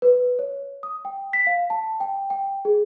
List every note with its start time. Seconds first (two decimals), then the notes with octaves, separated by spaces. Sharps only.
0.02 B4
0.39 C#5
0.83 D#6
1.05 G5
1.33 B6
1.47 F5
1.70 A5
2.00 G5
2.30 G5
2.65 G#4